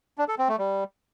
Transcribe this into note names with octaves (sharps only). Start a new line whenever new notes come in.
D4
A4
C4
A3
G3